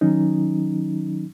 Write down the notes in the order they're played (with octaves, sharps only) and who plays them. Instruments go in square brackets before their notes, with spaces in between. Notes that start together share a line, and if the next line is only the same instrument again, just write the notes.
[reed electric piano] D#3 F#3 C#4 D#4